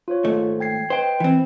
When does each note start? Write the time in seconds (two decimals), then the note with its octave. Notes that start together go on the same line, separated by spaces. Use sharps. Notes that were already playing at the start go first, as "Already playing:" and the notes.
0.08 F4 C5 C#5
0.24 D#2 G#2 A3
0.60 G5 G#6 C7
0.90 B4 C5 D#5 G5
1.20 E3 C4